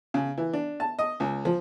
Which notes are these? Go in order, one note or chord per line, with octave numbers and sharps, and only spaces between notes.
C#3
E3
D4
A5
D#5
C#2
F3